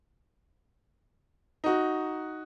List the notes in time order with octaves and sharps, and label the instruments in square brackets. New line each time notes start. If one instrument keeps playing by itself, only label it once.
[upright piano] D#4 F#4